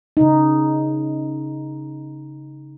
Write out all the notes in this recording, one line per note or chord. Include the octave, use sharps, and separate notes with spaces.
C#3 D#4